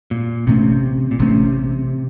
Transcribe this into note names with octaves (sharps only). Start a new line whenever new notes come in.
A#2
A1 A2 C3 A3 C#4
A#2
A1 A2 C3 A3 C#4